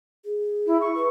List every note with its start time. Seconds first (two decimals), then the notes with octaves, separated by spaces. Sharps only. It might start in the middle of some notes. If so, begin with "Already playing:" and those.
0.25 G#4
0.67 E4
0.81 C#6
0.95 B4